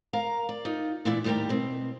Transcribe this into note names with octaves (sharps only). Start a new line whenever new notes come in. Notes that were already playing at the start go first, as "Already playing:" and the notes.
A#4 F5 A#5
D5
D#4 F4
A#2 E3 D4 E4 D5 E5
D#2 A2 G3 G4 A#4 G5
B2 C4